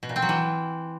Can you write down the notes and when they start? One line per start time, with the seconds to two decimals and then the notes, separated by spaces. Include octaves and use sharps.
0.03 B2
0.09 A#2
0.16 C4
0.22 F#3
0.29 E3